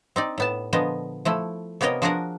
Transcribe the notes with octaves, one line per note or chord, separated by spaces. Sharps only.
C4 D#4 D5
A2 B3 A5
A#2 D3 F3 B3 D#5
F3 A3 E4
C3 A#3 B3 A#4 C#5 D#5
F3 D4 F#4 G#4 A#4 F#5